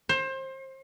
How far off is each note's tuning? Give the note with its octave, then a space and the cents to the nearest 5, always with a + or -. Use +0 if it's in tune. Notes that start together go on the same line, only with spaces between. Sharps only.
C5 +25